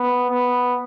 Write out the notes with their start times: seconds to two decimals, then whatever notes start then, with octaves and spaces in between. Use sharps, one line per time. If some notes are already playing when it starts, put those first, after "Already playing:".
Already playing: B3
0.30 B3